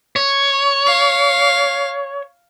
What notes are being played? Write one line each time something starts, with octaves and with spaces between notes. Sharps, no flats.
C#5
F5